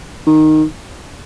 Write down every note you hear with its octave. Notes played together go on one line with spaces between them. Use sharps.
D#3